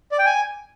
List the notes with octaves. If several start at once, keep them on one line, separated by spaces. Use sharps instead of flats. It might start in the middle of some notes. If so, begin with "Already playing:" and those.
D5
G5
G#5